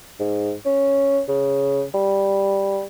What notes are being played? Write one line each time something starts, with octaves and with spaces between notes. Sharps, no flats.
G#2
C#4
C#3
G3